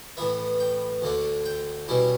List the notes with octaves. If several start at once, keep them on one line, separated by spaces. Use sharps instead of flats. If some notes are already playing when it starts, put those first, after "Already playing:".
A2 E3 B3 E5
G5
D2 D3 A3 D4
G5
B2 G3 C#4 E4